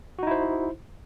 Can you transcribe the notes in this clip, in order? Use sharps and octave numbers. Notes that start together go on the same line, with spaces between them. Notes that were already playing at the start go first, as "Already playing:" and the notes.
D#4 E4 F#4 C5